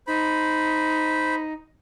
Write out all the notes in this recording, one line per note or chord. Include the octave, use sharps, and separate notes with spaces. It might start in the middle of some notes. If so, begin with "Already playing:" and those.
D#4 C5 B5